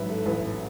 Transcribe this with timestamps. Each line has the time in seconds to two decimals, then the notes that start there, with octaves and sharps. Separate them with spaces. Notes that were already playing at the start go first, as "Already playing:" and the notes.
Already playing: A1 G#2 F#3 B4 E5
0.09 A4
0.26 A1 B4